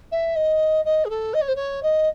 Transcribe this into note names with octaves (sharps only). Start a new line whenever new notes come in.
E5
D#5
D#5
G#4
A4
D#5
C#5
C5
C#5
D#5